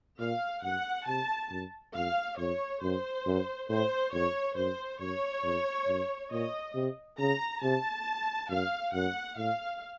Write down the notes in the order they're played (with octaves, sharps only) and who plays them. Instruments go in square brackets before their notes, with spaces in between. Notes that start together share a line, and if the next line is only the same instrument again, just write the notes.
[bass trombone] A#2 [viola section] F5
[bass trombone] F#2 [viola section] F#5
[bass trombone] C3 [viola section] A5
[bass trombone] F#2
[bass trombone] F2 [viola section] F5
[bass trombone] F2 [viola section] C#5
[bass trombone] F#2 [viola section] C5
[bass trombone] F#2
[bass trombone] A2 [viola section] C5
[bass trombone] F2 [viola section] C#5
[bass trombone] F#2 [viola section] C5
[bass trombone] F#2 [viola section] C#5
[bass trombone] F2
F#2
[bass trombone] A#2 [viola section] D#5
[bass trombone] C3
[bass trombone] C#3 [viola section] A#5
[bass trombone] C3 [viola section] A5
[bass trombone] F#2 [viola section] F5
[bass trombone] F#2 [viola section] F#5
[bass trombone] A2 [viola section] F5